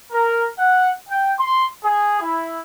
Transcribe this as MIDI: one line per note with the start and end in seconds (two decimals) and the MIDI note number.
0.12 0.45 70
0.58 0.90 78
1.08 1.31 79
1.39 1.66 84
1.84 2.20 68
2.21 2.59 64